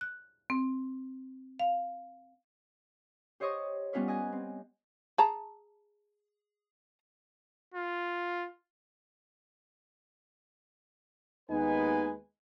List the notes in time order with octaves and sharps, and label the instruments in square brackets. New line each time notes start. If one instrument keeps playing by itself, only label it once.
[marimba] F#6
C4
F5
[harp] G4 C5 C#5 D#5 C#6 D#6
G3 B3 C#4 F4 B4 C#5
D#5 G#5 F#6
C4
[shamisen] G#4 A5 A#5
[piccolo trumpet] F4
[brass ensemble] D#2 B4 G#5 [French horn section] G#3 B3 D#4